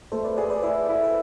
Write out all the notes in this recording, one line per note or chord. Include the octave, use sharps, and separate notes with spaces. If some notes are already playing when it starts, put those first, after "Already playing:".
A3 A4 C5
B4 D5
G#4 B4 D5
B4 D5
E4 B4 D5
E4
B4